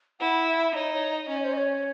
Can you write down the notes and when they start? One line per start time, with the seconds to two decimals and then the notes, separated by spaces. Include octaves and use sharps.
0.20 E4 F#5
0.48 E5
0.75 D#4 C#5
0.94 C#5
1.12 D#5
1.29 C#4 D#5
1.37 C#5
1.44 C5
1.53 D#5
1.57 C#5